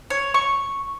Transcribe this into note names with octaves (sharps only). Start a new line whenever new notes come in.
C#5
C#6